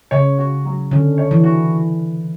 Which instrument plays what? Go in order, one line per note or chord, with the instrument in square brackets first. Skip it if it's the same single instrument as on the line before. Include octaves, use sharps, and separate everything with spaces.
[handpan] C#3 [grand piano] C#5
[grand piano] F#4
F#3
[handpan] D3 [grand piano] C#4
[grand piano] C#5
[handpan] E3
[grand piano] F#4